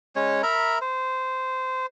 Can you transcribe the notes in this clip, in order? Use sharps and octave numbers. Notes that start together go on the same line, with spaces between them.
G#3 C#4 C#5
A#4 E5 A#5 B5
C5